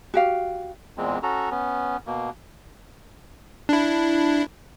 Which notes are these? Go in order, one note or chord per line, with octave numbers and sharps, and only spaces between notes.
F#4 G4 F5
E2 A#2 G#3 C4
C#4 F#4 A4 A#5
B3 C#4
B2 A#3
D4 E4